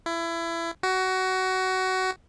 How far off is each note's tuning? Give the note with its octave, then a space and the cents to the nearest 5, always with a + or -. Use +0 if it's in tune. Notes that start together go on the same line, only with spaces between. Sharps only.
E4 +25
F#4 +20